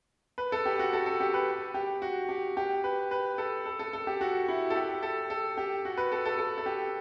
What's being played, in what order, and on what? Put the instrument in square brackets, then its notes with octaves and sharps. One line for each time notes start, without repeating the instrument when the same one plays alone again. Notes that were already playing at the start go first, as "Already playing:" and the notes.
[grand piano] B4
A4
G4
F#4
A4
A4
G4
B4
G4
F#4
G4
G4
B4
B4
A4
A4
A4
A4
G4
F#4
E4
A4
G4
A4
A4
G4
F#4
B4
A4
A4
A4
A4
G4